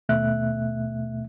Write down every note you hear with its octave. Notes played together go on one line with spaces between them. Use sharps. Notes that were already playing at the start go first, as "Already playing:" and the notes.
D#2 B2 A3 E5 F#6